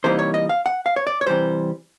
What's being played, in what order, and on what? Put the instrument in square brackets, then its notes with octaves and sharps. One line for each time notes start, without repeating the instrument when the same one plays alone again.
[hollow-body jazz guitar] C3 E3 G3 A#3 D#4 C5
C#5
D#5
F5
F#5
F5
C#5
D5
C#5
C3 E3 G3 C5